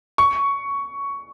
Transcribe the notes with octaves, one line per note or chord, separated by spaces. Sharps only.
C#6